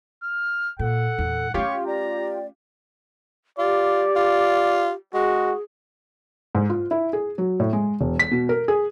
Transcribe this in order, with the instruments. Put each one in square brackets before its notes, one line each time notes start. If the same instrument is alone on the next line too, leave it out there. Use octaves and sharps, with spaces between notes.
[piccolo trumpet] F6
[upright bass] A#2 [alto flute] A4 [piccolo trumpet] F#5
[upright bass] E2 A#2
[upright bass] A3 C#4 [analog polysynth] F4 G4 [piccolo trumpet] C#5 [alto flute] F5
[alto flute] D5 [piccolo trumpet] A#5
[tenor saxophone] F4 [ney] G4 [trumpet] D5
[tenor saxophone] F4
[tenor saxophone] G#3 [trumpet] F#4 [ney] G#4
[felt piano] G#2
F4
E4
G#4
F#3
A2
G#3
E1
B6
B2
A#4
G#4